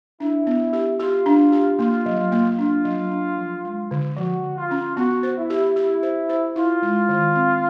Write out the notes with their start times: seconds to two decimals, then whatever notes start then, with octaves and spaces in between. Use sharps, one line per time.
0.20 D4 E4
0.47 B3
0.73 G4
0.99 F4 G4
1.26 D4
1.52 G4
1.79 A#3 F4
2.06 F#3
2.32 A#3
2.59 D4 F4
2.85 F#3
3.11 D4
3.38 F3
3.65 G#3
3.91 D3
4.17 F3 F#4
4.43 D3
4.57 F4
4.71 C#4
4.96 B3 F#4
5.23 C5
5.37 E4
5.50 G4
5.76 E4 G4
6.03 C5
6.29 C5
6.56 E4 F4
6.82 G#3
7.09 D#3
7.35 C4